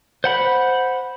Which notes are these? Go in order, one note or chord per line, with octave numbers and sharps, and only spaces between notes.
C5 F#5 B5